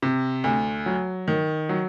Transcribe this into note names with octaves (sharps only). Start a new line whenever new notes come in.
C3
D2
F#3
D#3
F#3